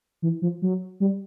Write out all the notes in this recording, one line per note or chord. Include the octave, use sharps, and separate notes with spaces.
E3
F3
F#3
G3